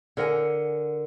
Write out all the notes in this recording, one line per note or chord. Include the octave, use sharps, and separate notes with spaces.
D3 A#4 F#5 G#5